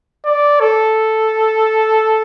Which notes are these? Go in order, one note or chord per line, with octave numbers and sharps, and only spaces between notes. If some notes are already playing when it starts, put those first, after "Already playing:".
D5
A4